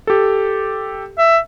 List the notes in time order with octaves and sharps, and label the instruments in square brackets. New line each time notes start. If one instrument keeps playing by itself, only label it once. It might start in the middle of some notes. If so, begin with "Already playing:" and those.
[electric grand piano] G4 A4
[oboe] E5